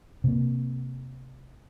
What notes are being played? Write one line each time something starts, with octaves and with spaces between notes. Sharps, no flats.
C3 A#3